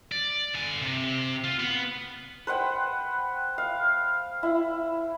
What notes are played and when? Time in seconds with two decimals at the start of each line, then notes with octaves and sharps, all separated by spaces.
0.12 D5
0.54 D3 G#5
0.82 C3
1.44 F4
1.60 B3
2.47 B4 C5 F#5 G5
3.58 F5
4.43 E4